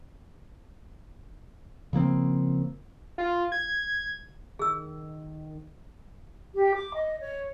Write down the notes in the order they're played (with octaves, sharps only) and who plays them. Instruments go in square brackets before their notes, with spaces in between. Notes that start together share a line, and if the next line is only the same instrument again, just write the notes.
[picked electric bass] C#3 F3 A#3 C4
[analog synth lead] F4
G#6
[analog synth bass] D#3 [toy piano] G#4 E6
[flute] G4
D6
D#5
C#5